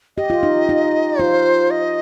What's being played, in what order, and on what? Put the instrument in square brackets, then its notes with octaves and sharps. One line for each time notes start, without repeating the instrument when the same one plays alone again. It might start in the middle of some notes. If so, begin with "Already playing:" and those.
[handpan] G4 [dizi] D#5
[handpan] F4
D#4
D#4
[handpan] F4 [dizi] C5
[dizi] D#5